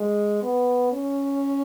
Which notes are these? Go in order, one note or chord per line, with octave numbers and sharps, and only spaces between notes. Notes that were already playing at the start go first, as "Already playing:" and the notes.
Already playing: G#3
B3
C#4